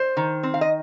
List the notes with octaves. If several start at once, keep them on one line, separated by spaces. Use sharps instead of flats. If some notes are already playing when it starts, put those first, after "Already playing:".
Already playing: C5
D#3
C4
F5
D#5